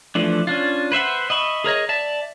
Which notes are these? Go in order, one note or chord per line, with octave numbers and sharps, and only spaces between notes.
E3 F3 A3 D4
C#4 D4 F4
B4 C5 E5 F#5
D#5 E5 B5 C#6
G#4 A#4 C#5 D#5
D5 E5 A5